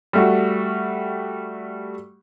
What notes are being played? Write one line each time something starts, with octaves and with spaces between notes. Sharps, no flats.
G3 A3 F#4